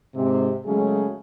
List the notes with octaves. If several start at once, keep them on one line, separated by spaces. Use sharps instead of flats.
G#2 C3 C4
C#3 F#3 G#3 A3 C#4 G#4